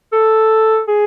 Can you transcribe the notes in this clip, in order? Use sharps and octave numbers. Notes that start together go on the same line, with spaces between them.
A4
G#4